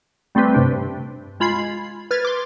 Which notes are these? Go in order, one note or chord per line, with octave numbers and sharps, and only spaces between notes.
G3 A3 C4 G4 B4
G2 C3 D4
G#3 F4 B5 G#6 C7
B4 F6 G#6 A6
C6 D6